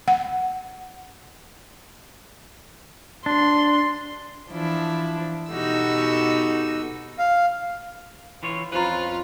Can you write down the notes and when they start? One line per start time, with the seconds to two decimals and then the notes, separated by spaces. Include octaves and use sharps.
0.08 F#5
3.26 D4 C6
4.49 E3 F3 D4 E4
5.51 B2 D#4 F#4 G4 A4 E6
7.19 F5
8.43 E3 F4 C#5
8.72 F2 C#4 F4 B4 C5 A#5